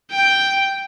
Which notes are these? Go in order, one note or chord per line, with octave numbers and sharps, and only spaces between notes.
G5